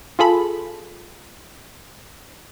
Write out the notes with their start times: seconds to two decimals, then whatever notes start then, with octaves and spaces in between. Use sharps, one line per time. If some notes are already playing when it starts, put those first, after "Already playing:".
0.19 F4 G#4 A4 B5